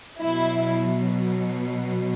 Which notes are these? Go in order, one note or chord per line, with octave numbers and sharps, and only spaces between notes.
B2 F#3 E4